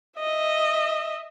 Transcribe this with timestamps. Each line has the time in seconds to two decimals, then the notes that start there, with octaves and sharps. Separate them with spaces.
0.20 D#5 E5